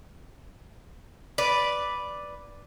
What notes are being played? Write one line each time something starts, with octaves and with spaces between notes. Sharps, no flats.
B4 D5